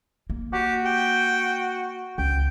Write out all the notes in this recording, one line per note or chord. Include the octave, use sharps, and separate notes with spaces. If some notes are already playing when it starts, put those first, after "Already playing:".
A#3
F#4 G4
G5
C#2 G5